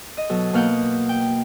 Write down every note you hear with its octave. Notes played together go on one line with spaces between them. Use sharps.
D#5
B2 F#3 F#4 A4
B2 A#3 F5 F#5 D#6 G6
G5